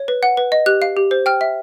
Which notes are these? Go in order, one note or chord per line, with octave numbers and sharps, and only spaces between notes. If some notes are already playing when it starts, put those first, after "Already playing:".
Already playing: C#5
B4
F#5
B4
D#5
G4 F#6
F5
G4
C5
G5 F6
E5